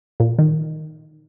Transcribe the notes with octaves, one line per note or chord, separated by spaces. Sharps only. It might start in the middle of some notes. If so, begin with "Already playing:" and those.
A#2
D#3